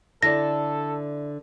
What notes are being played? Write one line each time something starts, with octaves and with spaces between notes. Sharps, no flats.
D3 E4 A4 D5 A#6